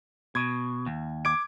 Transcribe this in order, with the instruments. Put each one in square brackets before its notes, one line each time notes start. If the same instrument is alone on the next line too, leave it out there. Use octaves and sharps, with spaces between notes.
[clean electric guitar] B2 [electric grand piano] G#6
[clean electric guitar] D#2
[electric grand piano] D6 G#6 D7